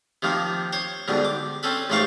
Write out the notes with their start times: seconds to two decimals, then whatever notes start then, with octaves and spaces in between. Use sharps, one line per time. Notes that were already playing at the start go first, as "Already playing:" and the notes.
0.22 C3 D#3 F3 A#3
0.73 C5 C#5
1.08 G#2 B2 D3 G3
1.25 D6
1.63 C4 C#4 A4 B4
1.90 A1 G#2 A3 C5 F5 C#6